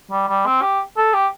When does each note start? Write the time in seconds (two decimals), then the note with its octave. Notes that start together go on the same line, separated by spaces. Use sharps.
0.12 G3
0.29 G3
0.46 C4
0.62 G4
0.97 A4
1.14 G4